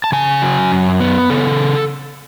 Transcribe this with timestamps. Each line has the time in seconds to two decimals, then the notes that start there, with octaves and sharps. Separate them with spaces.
0.04 A5
0.12 C#3 G#5
0.42 F#3
0.72 F#2
1.00 B3
1.30 C#3 A4